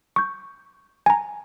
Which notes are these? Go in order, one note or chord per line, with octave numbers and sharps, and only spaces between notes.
C#6 G6
G#5 A#5